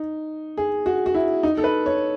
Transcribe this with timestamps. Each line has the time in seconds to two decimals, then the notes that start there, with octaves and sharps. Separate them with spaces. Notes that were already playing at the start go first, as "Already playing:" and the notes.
Already playing: D#4
0.57 G#4
0.86 F#4
1.06 F#4
1.14 E4
1.43 D#4
1.57 A4
1.64 B4
1.86 C#5